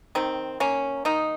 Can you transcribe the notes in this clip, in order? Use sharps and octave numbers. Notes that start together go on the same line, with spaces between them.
D#3 C4
A#3 C#4
D#3 D#4